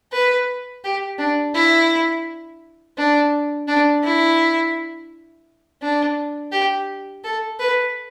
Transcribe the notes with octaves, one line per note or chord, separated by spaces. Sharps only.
B4
G4
D4
E4
D4
D4
E4
D4
G4
A4
B4